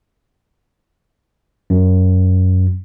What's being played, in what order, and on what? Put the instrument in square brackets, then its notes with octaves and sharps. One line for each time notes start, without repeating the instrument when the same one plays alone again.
[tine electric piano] F#2